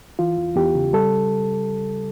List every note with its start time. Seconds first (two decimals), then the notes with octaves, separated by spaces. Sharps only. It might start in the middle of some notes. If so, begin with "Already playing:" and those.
0.19 E3 F4
0.37 E2
0.55 E2 G4
0.75 C#3
0.93 G3 A4